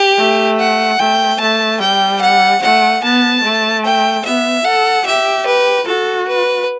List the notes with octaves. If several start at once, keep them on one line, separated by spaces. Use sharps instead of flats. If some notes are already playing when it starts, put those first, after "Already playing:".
Already playing: G4
A3
F#5
A3 G5
A3 A5
G3 G5
F#5
A3 F#5
B3 A5
A3
G5
B3 E5
A4 F#5
G4 E5
B4
F#4 A4
B4